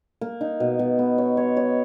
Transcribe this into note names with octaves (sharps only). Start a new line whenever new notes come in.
A#3
D#4
B2
B2
B3
C#5
C#5
C#5